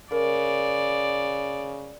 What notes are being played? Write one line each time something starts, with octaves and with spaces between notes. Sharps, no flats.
C#3 A#4 D5